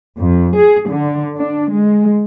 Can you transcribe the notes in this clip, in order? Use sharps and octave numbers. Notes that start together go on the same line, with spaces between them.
F2
G#4
D3
D4
G#3